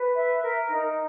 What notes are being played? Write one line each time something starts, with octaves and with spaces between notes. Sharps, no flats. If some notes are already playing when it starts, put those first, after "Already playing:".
Already playing: B4
E5
A#4
D#4